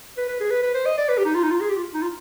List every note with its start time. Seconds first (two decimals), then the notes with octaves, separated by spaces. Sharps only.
0.17 B4
0.28 B4
0.40 G#4
0.51 B4
0.63 B4
0.74 C5
0.86 D#5
0.98 D5
1.09 B4
1.18 G4
1.25 D#4
1.35 F4
1.43 D#4
1.51 F4
1.60 G#4
1.69 G4
1.77 F4
1.94 D#4
2.02 F4